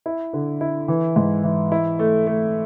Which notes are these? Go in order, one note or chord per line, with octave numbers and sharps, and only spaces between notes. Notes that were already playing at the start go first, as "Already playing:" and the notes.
E4
D3
E4
E3
G#2
E3
E4
A3
A3